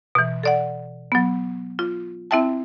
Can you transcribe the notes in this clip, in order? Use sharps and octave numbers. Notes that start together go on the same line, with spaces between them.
B2 E3
A4 D5 F#5
F#3 B3
F4
C4 E4 E5 G5 A5